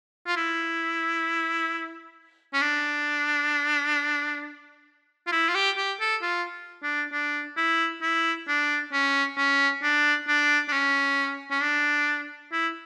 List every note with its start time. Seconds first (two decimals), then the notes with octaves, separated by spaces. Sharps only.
0.27 F4
0.36 E4
2.53 C#4
2.61 D4
5.27 F4
5.32 E4
5.49 F4
5.55 G4
5.77 G4
6.00 A4
6.22 F4
6.83 D4
7.12 D4
7.57 E4
8.02 E4
8.48 D4
8.92 C#4
9.37 C#4
9.83 D4
10.28 D4
10.68 D4
10.72 C#4
11.51 C#4
11.62 D4
12.52 E4